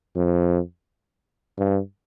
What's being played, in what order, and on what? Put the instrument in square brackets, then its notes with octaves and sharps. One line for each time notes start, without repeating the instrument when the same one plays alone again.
[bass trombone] F2
G2